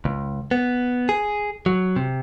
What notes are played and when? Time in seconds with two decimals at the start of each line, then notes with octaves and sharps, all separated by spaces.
0.05 C#2
0.51 B3
1.09 G#4
1.66 F#3
1.96 C3